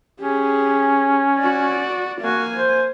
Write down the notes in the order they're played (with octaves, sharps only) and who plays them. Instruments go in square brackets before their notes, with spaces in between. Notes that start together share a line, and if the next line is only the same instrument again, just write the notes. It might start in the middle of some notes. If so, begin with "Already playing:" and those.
[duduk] C#4 [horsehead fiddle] G4 G#4
[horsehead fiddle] F#4 D5
[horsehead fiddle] A#3 G#5 [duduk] F#4
[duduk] C5